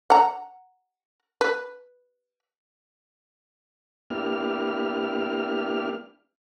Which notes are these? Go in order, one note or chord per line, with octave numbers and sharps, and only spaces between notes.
F#5 A#5
B4
A#3 B3 D4 E4 G4 F6